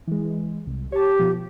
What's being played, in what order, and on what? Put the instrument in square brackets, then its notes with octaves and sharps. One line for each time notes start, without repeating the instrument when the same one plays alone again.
[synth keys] E3 G#3
C2
[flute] G4 [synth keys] C#5 A5
[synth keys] B2 F3